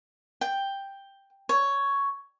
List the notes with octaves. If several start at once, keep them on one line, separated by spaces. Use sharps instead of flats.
G5
C#5